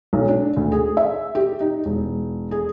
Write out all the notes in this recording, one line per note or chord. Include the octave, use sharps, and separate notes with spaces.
B1
D4
D2
G#4
E5
G4
D#4
E1
G#4